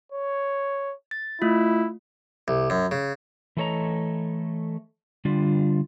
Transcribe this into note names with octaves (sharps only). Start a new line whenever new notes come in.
C#5
A6
A3 E4 F4
C2
F#2
C#3
E3 A3 A4 C#5 D#5 A#5
D3 G3 D4 F4